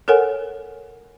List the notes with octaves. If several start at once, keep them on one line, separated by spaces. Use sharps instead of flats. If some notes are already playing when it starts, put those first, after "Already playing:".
A4 A#4 C#5 F#5 G#5